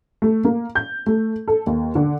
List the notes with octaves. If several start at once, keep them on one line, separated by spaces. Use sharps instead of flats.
A3
A#3
G6
A3
A4
D#2
D3